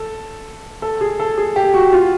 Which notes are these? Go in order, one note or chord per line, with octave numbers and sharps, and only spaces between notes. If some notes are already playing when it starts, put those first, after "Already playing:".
Already playing: A4
A4
G#4
A4
G#4
G4
F#4
F4